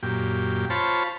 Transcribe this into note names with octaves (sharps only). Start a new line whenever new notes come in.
F#2 A#2 G4
F4 C5 C#5 A5 B5